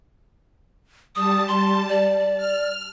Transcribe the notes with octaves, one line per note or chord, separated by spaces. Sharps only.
G3 A5 D#6
C6
D5
F6